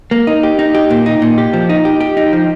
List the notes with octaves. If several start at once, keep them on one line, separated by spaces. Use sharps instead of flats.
A#3
D#4
G4
D#4
G4
A#2
D#4
A#2
G4
F3
D#4
G4
G4
D#4
F3